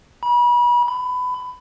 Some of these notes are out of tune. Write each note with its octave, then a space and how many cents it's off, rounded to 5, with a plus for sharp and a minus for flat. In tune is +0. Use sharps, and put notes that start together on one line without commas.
B5 -35
B5 +20